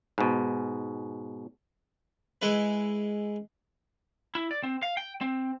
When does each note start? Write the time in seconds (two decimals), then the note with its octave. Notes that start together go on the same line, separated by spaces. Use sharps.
0.18 G#2 B2
2.42 G#3 E4 B4
4.35 E4
4.51 D5
4.63 C4
4.83 F5
4.97 G5
5.21 C4